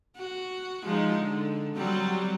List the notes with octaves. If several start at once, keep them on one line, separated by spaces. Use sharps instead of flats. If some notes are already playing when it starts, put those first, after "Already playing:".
F#4
F3 G#3 D#4
D3
F#3 G3 C4